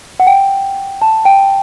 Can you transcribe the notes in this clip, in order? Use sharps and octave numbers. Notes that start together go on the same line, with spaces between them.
F#5
G5
A5
G5